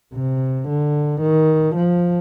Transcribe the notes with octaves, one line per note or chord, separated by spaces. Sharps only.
C3
D3
D#3
F3